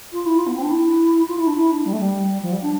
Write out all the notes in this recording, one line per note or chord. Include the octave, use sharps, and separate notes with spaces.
F4
E4
F4
B3
C4
D4
E4
F4
E4
D4
E4
D4
G3
A3
G3
F3
G3
D4